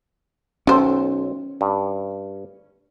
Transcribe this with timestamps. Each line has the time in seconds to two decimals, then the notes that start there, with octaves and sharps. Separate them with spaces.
0.67 B1 D#3 C#4 A4 C5 G5
1.61 G2